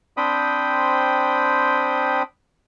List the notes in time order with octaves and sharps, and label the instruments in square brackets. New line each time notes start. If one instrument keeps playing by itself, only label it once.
[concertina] C4 D4 C5 G5 B5 D#6